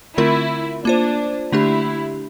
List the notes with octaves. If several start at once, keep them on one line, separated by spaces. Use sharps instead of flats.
D3 A3 C4 E4 F4 A#4
A#3 D4 F4 C5
D3 A3 D4 E4 G4